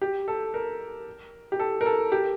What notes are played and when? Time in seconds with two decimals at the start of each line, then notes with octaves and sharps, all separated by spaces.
0.01 G4
0.28 A4
0.54 A#4
1.52 G4
1.59 A4
1.81 A#4
1.86 A4
2.12 G4